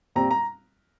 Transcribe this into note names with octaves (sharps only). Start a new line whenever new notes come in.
A#2 G3 C4 A#5
A#5